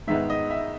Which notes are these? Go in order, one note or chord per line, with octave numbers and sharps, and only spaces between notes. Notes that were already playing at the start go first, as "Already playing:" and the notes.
G#2 D#3 G#3 B3 D#4 E5
D#5
E5